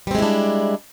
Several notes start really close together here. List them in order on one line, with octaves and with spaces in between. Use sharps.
G3 C4 G#3 E4 D4